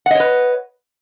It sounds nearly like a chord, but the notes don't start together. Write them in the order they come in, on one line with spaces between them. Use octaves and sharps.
F#5 D#5 C#5 B4